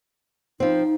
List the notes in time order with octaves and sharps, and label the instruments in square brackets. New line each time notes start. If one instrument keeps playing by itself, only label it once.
[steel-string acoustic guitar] F3 C4 [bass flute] D#4